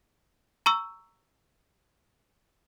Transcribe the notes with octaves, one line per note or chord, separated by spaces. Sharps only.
A#5 C#6 E6